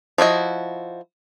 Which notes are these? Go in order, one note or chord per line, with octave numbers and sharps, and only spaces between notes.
F3 E4 F#4 D#5